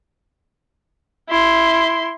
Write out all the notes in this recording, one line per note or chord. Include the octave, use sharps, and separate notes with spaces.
E4 C6